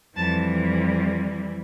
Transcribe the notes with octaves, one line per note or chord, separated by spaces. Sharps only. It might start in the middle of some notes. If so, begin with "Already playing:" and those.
F2 E3 G3 A5